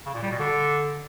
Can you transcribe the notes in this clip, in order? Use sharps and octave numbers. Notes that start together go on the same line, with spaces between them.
C#3
A#2
G3
B2
D3